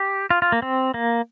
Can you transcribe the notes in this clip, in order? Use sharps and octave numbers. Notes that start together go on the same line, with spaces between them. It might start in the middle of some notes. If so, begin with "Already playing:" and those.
Already playing: G4
F4
F4
A#3
C4
A#3